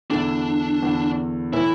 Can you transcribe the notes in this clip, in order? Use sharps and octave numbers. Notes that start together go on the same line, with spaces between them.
E2 D3 A3 D4
E2 D3 A3
A2 E3 A3 E4